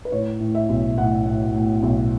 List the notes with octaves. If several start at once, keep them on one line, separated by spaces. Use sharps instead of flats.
B4
A2 C#5
A2
E5
B1
A2 F#5
A2
A2
B1